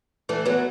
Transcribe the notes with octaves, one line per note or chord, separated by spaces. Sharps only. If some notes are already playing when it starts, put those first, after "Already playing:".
E3 A3
F#3 B3